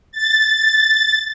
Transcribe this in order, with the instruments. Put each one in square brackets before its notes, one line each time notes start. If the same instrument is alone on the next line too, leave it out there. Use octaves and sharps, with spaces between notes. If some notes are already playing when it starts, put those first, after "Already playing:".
[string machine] A6